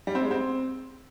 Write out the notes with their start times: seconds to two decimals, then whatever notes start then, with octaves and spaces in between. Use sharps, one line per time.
0.07 G3
0.15 C4
0.23 G#3
0.31 C4